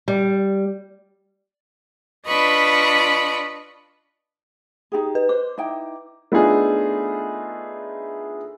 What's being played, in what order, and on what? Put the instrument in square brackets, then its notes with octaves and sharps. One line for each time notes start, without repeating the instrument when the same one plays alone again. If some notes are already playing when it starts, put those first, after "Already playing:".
[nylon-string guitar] G3
[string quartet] D4 F4 B4 D#5 B5 C#6
[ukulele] D#4 G4 G#4
[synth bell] B4
[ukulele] C5 [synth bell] D6
[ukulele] D#4 E4 G5
[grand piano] A3 B3 D4 D#4 F4 G#4